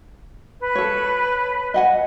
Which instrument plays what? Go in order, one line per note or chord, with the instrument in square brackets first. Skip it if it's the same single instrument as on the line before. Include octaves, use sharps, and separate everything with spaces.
[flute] B4
[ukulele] A4 C#5
D#5 F#5 G#5